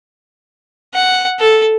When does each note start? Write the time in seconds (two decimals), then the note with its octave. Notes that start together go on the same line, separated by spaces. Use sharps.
0.94 F#5
1.40 A4